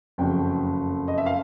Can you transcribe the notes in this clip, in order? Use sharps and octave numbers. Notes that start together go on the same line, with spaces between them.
F#1 F2 C#3 F#3 G5
D#5
E5
F5